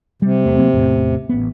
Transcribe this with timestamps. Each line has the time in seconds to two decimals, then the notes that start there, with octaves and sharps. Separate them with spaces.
0.22 C3 G3
0.45 E2 A3 C4
0.58 F#3 A#3 C4
0.72 A1 E2 A2
1.29 A1 B3